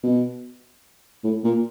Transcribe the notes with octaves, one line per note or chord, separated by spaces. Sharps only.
B2
A2
A#2